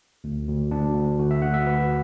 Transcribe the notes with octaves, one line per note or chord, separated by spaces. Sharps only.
D2
D2
D2 D4
D2
D3 F#4
E5
D2 F#5
E5
D2 B4